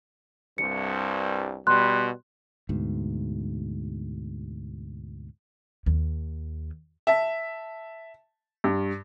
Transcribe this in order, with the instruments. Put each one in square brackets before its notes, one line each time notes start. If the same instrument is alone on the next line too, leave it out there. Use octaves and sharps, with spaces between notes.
[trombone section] C2 G2 [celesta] C#7
[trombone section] B2 G3 [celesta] C6 F#6
[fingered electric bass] D2 G#2 B2
[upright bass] D#2
[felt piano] E5 A5
G2